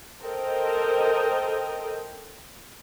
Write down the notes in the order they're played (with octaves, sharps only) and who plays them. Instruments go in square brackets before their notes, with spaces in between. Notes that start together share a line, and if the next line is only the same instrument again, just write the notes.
[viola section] A4 A#4 C5 D#5 G5